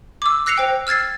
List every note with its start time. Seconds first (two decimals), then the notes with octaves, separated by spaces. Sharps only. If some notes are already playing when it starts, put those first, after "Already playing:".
0.22 D6 E6
0.46 E6 F#6 A#6 C7 C#7 F7
0.58 C5 G5
0.87 E6 F6 G#6 A6 C7